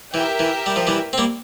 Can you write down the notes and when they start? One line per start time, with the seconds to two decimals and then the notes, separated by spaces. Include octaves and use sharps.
0.14 E3 G4 A#4 E5 G5
0.39 E3
0.66 G3
0.76 F3
0.87 E3 G3
1.13 C4
1.18 G3 A#3